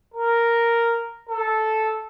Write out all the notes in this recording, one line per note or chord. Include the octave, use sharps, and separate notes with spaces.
A#4
A4